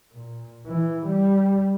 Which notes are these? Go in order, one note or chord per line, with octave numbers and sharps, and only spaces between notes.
A#2
E3
G3